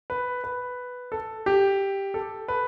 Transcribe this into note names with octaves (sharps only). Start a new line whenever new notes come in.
B4
B4
A4
G4
A4
B4